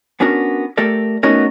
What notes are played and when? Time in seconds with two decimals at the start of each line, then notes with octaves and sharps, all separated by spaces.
0.20 B3 C#4 D4 F#4 A#4
0.78 A3 G4 A4 A#4 D5
1.23 A3 B3 C#4 D#4 F#4 A#4